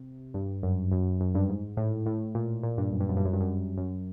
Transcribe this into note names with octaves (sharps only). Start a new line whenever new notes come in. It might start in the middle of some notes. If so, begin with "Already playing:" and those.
Already playing: C3
G2
F#2
F#2
F#2
G2
G#2
A2
A2
A#2
A#2
G2
F#2
G2
F#2
G2
F#2
G2
F#2
F#2